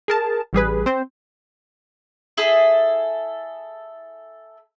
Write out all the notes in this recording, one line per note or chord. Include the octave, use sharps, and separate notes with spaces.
G#4 A#4 A5
A1 G3 G#4 B4
C4 C5
E4 G#4 A4